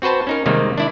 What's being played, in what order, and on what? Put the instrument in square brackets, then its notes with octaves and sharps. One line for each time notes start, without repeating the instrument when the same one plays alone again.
[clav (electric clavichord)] C4 F#4 B4 C5 A5
C#4 D#4 A#4
C3 D#3 G3 G#3 A#3
D4 E4 D5